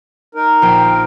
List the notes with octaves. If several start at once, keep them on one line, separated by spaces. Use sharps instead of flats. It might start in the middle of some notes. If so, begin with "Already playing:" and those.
D#4 A#4
A#1 C5 G5